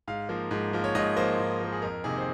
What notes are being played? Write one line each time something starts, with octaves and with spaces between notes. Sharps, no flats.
G#2 F5
F3 A#3
G#2
F3 A#3
C#5
G#2 D#5
F3 A#3 C5
G#2
F3 A#3
G#4
F2 A#4
C3 D#3 A#3 G#4
C5